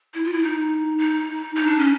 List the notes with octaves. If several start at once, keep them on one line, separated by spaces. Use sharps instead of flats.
E4
F4
E4
D#4
D#4
D#4
D4
C#4